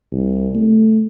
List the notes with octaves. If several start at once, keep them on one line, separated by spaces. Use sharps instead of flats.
C2
A3